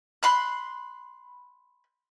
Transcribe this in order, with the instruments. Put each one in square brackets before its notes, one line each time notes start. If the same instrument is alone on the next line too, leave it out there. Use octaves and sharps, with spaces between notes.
[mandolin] B5 C6 F#6